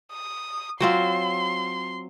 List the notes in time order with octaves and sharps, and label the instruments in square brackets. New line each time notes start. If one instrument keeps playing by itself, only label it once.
[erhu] D#6
[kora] F#3 C4 F4 [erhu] C6